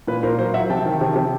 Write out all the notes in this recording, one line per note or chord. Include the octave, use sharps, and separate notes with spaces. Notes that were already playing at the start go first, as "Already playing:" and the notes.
A#2 B4
A#2 A#4 C5
F#3 A#4 C5
F#3 E5 F#5
C3 G5 A5
D#3
C3
C3